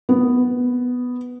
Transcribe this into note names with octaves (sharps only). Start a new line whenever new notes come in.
B3